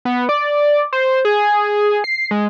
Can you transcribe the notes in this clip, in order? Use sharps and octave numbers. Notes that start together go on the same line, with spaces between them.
B3
D5
C5
G#4
C7
G#3